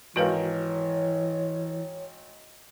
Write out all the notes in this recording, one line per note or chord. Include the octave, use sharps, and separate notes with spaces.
G#1 E3 F#4 A#4 B4 C#5 F5